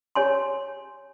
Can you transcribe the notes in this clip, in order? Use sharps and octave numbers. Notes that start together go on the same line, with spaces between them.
G4 C#5 G#5 C6